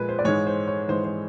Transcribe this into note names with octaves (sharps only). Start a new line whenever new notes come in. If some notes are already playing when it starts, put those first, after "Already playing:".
Already playing: A#2 F3 G#3 B4
C5
D5
G#2 E3 G#3 C#5
C5
C#5
G#2 E3 G#3 C5
C5